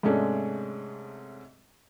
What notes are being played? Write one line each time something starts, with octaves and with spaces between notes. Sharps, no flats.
G#2 C3 G#3 A3 C#4 D4